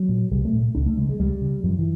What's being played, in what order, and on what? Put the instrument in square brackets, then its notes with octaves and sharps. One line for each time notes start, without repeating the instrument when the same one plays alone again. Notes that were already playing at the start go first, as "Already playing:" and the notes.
Already playing: [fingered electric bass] F#3
A#2
C2 G3
A3
A#2
C#2 D4
A3
C#3 G#3
G#3
C#2 G3
C#3
F#2 F3
E3